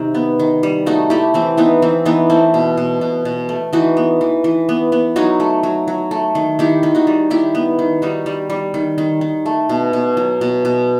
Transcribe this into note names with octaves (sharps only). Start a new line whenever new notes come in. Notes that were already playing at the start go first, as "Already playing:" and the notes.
Already playing: C3 D#3 D#4 F#4
B3
D#3
G3
A3 D#4 F#4
A3 E4 G4
E3 C4
E3 B3 D#4
E3 C4
E3 B3 D#4
A3 C4 E4
B2
B2
B2
B2
A3
E3 D#4 F#4
B3
E3
E3
B3
B3
F#3 D#4 F#4
A3
F#3
F#3
A3
D#3
D#3 E4 G4
D#3
D#4 F#4
G3
D#3 E4 G4
B3
D#3
G3 D#4 F#4
G3
G3
D#3
D#3
D#3
A3
B2
B2
F#3
B2
B2